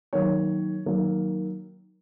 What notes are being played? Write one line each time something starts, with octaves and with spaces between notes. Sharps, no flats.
D#3 F#3 A#3 C#5
D#3 F#3 A#3